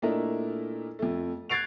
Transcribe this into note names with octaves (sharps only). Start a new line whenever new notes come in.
A#2 A3 D4 E4 A#4 D#5
F2 A3
F#6 G#6 A6 C7 D7 F7